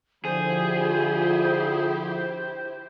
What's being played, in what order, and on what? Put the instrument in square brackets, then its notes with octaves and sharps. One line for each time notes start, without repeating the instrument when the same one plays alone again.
[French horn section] D3 F3 [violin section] E4 G4 [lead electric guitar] G#4 [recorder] C5